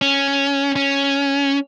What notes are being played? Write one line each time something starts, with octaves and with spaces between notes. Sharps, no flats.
C#4
C#4